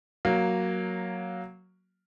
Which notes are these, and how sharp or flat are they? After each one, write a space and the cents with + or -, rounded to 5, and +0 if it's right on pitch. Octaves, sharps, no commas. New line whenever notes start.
F#3 +0 A#3 +0